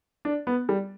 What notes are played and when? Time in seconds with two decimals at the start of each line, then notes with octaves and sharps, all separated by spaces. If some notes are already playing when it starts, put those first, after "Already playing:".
0.25 D4
0.47 B3
0.69 G3